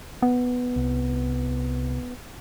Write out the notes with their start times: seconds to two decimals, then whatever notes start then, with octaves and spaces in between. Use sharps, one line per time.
0.22 B3
0.76 C2